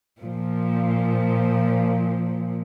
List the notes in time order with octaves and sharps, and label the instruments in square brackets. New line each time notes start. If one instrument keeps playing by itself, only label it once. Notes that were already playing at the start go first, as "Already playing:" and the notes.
[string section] A#2 F3